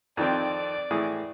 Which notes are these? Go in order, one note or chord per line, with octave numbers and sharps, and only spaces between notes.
F2 D#3 C4 D5
A2 E3 G#4